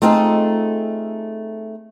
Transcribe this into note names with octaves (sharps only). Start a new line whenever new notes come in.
A3 C4 D#4 F4 G#4 A4